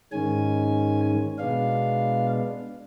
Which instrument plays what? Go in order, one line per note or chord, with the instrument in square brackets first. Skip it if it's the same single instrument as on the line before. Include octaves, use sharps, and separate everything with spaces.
[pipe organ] G#2 D#3 G#3 C#4 G#5
B2 G#3 B3 D4 F5